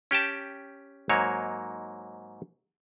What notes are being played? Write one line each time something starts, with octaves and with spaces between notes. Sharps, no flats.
C#4 G4 G5 A5
G#2 F#3 A#3 C#5